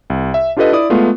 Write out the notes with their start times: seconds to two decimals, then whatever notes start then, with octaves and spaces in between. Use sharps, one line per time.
0.10 C2
0.34 E5
0.57 D4 F4 G4 A4 B4 D#5
0.73 E4 D5 D#6
0.90 G#3 A3 B3 F4